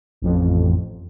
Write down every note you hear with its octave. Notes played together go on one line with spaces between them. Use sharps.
A1 F2